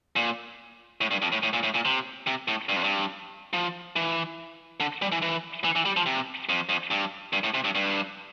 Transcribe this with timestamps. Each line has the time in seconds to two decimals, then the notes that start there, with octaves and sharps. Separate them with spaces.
0.16 A#2
1.01 A2
1.11 G2
1.22 F2
1.32 A2
1.43 A2
1.53 A#2
1.63 A2
1.74 A#2
1.85 C3
2.27 C3
2.48 A2
2.69 G2
2.76 F2
2.84 G2
3.53 F3
3.96 E3
4.80 D3
5.02 G3
5.12 E3
5.22 E3
5.64 E3
5.76 E3
5.85 G3
5.96 F3
6.06 C3
6.49 F2
6.69 F2
6.91 G2
7.33 G2
7.44 A2
7.54 C3
7.64 G2
7.75 G2